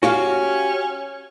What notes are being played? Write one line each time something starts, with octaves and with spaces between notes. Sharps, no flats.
C#4 F#4 G4 F5